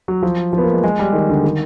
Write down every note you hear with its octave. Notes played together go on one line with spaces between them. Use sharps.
F#3
F3
F3
B3
A#3
G#3
G#3
G3
D#3
D3
D#3